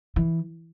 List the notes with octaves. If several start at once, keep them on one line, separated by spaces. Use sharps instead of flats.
E3